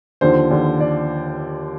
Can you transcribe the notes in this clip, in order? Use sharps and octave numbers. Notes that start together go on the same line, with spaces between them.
D#2 D3 F3 C5
D#2 D3 F3
D3 D5